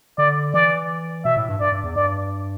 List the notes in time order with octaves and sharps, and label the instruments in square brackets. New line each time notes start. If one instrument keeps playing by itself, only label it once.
[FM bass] D3 [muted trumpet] D5
[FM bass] E3 [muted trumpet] D5
[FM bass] B2 [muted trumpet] E5
[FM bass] A2
G2
[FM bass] G2 [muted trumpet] D5
[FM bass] G2
E2
[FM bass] G2 [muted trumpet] D5